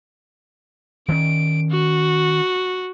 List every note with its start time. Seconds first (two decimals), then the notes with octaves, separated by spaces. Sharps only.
1.09 D#3 C#4 D7
1.70 F#4